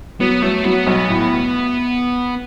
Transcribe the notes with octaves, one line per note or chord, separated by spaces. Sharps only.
F#3 B3
F#3 A3
F#3 B3
B1
A2